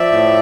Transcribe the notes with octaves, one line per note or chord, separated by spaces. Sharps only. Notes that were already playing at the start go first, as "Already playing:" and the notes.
Already playing: F3 D5 E5
A2